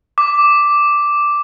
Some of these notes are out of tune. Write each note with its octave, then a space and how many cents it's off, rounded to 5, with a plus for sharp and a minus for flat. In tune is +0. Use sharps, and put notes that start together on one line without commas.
D6 +0